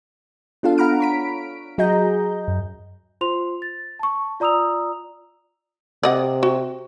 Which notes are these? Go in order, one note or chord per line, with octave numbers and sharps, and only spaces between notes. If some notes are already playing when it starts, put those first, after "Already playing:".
B3 D4 F4 A4 F5
F5 F#5 A#5 B5 F6 D7
C#5 B6 D7
F#3 F#4 G#4 D#5 A#5 G6
F#2
F4 C5 C6 F7
A6
A5 C#6
F4 D5 A#5 D#6 E6 F7
C3 D5 D#5 F#5
F#4